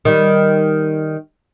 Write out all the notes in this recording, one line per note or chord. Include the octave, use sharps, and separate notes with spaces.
D#3 G3